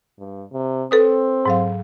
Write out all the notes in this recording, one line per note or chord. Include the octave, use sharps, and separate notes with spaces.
G2
C3
C4 A4 B4 D#6
G#2 F#3 F5